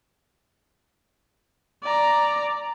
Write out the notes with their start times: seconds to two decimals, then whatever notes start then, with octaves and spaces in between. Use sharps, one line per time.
1.83 D5 A#5